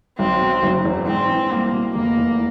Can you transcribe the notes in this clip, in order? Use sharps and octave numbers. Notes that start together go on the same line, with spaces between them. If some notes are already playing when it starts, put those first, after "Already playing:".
B1 C4
B2
F#1
E2
G#2 C4
E3
C2 A#3
B2
F1 A#3
E2